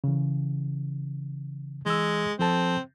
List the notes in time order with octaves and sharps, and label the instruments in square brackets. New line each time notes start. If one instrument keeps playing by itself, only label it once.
[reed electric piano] C#3 E3
[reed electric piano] E3 E6 [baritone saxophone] G#3
[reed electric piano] F3 A4 A5 [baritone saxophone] C4